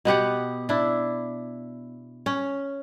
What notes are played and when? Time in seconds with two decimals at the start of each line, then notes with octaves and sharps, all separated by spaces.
0.05 B2 B3 G4 F#5
0.69 D4 E4
2.26 C#4